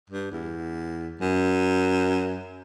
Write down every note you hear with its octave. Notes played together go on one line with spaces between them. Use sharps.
G2
E2
F#2